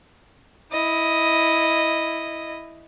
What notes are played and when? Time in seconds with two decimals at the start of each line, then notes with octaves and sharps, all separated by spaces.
0.72 E4 D#5